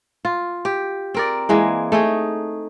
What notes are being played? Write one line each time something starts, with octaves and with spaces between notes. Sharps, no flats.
F4
G4
C4 A#4 D5
E3 G#3 A#3
A3 D#4 G#4